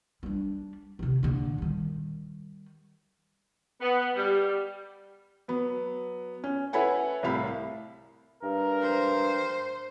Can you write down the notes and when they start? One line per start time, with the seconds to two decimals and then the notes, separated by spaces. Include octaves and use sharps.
0.23 G3 D4
0.99 C3 D#3
1.23 A#2 D3
1.58 D#3 G3
3.81 B3
4.15 G3
5.48 F#3 B3
6.44 C#4
6.73 E4 A4 B4 C#5 F#5 G#5
7.23 C2 A2 E5 F5 B5
8.43 G2 A#4
8.81 C5